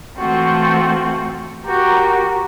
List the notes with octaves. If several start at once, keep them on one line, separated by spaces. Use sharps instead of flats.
E3 A3 C4 F4 F#4
F#4 G4 A#4 A#5